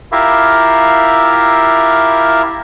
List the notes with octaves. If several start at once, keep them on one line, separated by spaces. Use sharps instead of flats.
E4 F4 G4 A#4 E5 F5